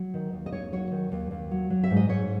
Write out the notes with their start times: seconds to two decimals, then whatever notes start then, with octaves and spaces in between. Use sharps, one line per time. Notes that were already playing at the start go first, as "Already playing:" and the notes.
Already playing: F#3
0.14 D#3
0.33 D#2
0.46 D#5
0.52 D#2 C#5
0.72 F#3 C#5
0.92 D#3
1.12 D#2
1.31 D#2
1.51 F#3
1.70 F#3
1.84 E5
1.90 G#2
1.97 D#5
2.09 G#2 C#5